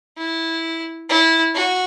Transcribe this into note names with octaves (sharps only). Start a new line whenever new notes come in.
E4
E4
F#4